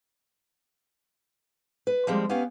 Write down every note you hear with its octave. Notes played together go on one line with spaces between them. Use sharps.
B4
F3 G3 G#3 A#3 C4
B3 C#4 G4 B4 F5